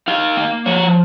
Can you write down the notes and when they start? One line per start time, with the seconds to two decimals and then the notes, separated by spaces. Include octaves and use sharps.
0.08 D#4 F5
0.37 A#3
0.66 F3 C#5